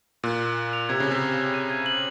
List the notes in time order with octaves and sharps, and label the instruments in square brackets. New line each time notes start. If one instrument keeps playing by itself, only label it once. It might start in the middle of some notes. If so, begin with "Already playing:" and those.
[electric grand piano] A#2 [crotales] F#6
[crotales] F#6
F#6
F7
[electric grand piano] C3 [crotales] G#6
[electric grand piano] C#3 [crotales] G#6
[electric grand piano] C3
[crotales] G#6
G#6
D#7
G#6
F#7